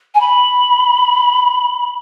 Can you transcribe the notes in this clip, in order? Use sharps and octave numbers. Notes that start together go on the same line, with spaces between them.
G#5
B5